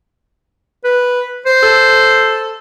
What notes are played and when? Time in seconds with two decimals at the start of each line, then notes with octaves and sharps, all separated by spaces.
0.84 B4
1.46 C5
1.63 A4